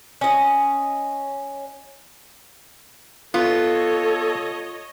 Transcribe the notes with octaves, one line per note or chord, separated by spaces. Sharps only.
C#4 D#5
B3 F4 A4 C#5 D#5